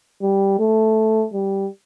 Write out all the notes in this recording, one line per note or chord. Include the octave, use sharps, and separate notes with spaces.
G3
A3
G3